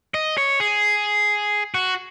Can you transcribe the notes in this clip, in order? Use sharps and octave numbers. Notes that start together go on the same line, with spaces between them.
D#5
C#5
G#4
F#4